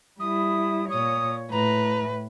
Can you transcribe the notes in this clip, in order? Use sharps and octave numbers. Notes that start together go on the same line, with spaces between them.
G3 E4 D#6
A#2 C#5 D#6
A2 B4 A#5